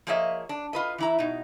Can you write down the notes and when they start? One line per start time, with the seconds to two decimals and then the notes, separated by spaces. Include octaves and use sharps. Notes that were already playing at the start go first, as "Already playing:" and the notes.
0.07 F3 A#3 G#4 C#5 D#5 E5
0.49 D4
0.73 F4 B4 D#5
0.98 E3 E4 A#5
1.19 B2 D#4